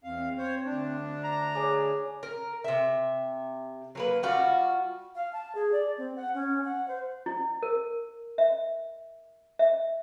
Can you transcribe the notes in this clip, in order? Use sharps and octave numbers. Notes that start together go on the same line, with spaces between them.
E2 C4 F5
C5 C#5
D2 D4
A#5
G#4 C#5 G#5 D6
A#4
C3 E5
F#3 A#3 B4
G3 F4 F#4 F5
F5
A5
G#4
D5
C4
F#5
C#4
F#5
C5
E4
A#4
E5
E5